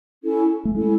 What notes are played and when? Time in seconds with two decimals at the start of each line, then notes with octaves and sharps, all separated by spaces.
0.23 C#4 E4 A4
0.65 A3
0.74 G#3 C#4 E4 A4